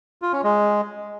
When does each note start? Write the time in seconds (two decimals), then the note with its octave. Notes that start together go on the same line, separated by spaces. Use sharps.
0.22 F4
0.33 C#4
0.44 G#3